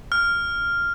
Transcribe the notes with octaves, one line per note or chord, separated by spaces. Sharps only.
F6